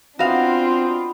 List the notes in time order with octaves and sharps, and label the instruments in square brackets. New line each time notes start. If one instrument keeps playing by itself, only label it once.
[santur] B3 D#4 B4 [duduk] C4 [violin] D4 F4 [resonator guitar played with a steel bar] F#4 F5